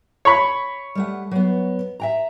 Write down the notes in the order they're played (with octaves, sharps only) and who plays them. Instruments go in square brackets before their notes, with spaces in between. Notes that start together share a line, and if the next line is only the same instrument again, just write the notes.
[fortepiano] C#5 B5
[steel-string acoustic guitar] G3 A3 F#5
F#3 B3
E5 G5 A#5